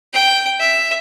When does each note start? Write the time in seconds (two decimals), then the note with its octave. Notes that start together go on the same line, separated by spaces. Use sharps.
0.13 G5
0.60 E5